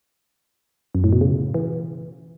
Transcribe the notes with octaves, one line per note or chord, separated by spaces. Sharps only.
F#2
A2
B2
C#3
E3